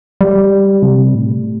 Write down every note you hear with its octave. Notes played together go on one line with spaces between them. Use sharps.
G3
C3
A2